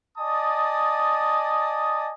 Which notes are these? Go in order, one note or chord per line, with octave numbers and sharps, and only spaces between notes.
D5 D#5 G#5 A5 D#6